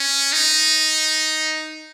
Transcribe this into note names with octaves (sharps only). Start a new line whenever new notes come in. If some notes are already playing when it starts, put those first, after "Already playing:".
Already playing: C#4
D#4